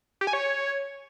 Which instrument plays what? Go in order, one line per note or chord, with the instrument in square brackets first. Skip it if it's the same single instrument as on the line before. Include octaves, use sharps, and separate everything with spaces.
[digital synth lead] G4
G#5
C#5